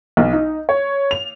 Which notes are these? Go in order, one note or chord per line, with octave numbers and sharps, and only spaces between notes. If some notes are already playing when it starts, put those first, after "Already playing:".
B1
D#4
C#5
F7